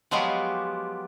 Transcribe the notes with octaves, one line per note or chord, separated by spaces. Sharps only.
F3 F#3 G#3 B3 F4 G4